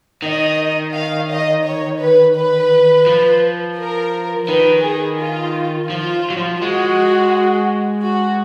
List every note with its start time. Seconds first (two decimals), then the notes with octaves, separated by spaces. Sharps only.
0.22 D#3 D#5
0.94 F5
1.29 D#5
1.65 C#5
2.01 B4
2.36 B4
3.07 F3
3.77 A#4
4.48 D#3 B4
4.84 G#4
5.20 F4
5.90 F3 F4
6.30 F#3
6.37 F3
6.61 G#3 F#4
8.03 F#4